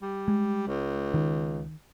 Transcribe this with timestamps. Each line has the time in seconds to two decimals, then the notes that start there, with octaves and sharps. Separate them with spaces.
0.02 G3
0.28 G#3
0.67 C#2
1.14 D#3